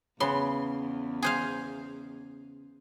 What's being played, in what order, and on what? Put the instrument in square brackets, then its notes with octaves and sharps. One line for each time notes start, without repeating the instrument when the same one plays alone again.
[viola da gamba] E2 [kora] C#3 B3 [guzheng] C6
[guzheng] G#4 C5 F5